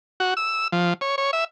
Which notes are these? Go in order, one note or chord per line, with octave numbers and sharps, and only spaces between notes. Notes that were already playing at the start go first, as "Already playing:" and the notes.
F#4
E6
F3
C#5
C#5
E5